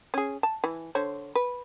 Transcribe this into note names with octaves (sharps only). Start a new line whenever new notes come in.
C#4 G#4
A5
E3
D3 C5 C#5
B4